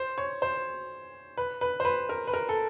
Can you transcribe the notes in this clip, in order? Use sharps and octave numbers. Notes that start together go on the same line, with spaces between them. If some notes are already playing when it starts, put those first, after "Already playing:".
Already playing: C5
C#5
C5
B4
B4
C5
B4
A#4
B4
A#4
A4